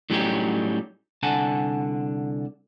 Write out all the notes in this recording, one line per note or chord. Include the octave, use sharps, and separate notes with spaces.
A2 F#3 G3 C#4 D#4 G4
C2 D3 F#5 G#5 A5